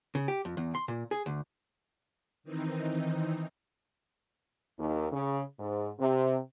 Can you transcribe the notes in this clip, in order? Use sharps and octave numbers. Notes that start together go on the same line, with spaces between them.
C#3
G4
F2
E2
C6
A#2
G#4
D2
D#3 E3 C4 D#4
D#2
C#3
G#2
C3